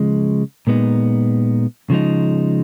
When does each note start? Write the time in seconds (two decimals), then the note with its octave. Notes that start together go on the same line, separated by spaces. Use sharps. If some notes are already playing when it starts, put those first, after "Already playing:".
Already playing: C#3 F3 G#3
0.67 A#2 G#3 B3 D#4
1.90 C#3 F3 G#3 D#4